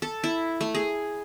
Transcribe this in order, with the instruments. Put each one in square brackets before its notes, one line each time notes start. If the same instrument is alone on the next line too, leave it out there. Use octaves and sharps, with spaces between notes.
[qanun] A4
E4
A3
G#4